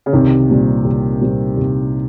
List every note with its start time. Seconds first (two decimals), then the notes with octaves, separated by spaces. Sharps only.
0.06 C#3
0.13 C2 C3 D#3
0.49 A#2 G3 C4
0.85 C2
1.21 A#2 G3 C4
1.57 C2